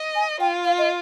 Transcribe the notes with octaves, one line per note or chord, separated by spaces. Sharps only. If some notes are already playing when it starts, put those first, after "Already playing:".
Already playing: D#5
G#5
F4 G5
F5
D#5